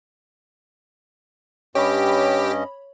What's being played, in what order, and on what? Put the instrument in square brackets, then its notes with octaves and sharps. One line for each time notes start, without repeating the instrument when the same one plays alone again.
[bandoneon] G2 C#4 D#5 [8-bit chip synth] G4 [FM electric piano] C#5 B5